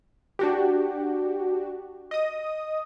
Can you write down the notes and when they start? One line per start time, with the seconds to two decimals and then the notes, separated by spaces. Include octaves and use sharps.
0.39 D4 F#4 G4
2.11 D#5 D#6